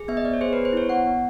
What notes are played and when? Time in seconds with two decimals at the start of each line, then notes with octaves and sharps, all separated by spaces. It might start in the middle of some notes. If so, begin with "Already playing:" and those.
Already playing: G#4
0.08 B3 E5
0.17 D#5
0.25 B3 D5
0.33 C#5
0.41 G#4 C5
0.53 B4
0.57 B3
0.65 C5
0.73 E4 C#5
0.89 B3 F#5
1.06 B3